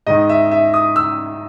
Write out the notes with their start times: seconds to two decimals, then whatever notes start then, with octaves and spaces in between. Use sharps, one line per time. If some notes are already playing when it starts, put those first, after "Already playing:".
0.07 G#2 D#3 D#5
0.29 E5
0.51 E5
0.74 D#6
0.96 E6